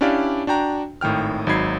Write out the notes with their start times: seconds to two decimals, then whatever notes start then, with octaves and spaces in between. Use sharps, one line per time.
0.01 C#4 D4 E4 G4 D5 F5
0.47 D4 F#4 G5 A#5
1.01 G#1 A2 D#3 G5 F6
1.47 G#1 F#3 D#4 B5 G#6 C7